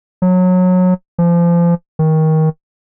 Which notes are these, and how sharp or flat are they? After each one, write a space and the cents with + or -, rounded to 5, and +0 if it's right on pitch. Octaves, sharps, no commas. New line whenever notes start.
F#3 -20
F3 -30
D#3 +20